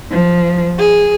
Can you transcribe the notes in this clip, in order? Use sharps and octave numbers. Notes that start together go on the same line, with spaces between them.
F3
G#4